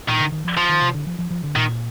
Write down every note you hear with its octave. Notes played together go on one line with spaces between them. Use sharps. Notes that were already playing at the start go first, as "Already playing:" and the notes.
A#2 D#3
D3
D#3
F3
F3
D#3
C3
D3
F3
F3
F3
D3
A#2 D#3